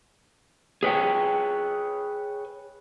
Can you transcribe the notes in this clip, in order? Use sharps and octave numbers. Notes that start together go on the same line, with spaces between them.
G#4 B4 C#5 G5